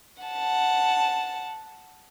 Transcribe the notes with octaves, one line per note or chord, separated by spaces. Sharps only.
F#5 A5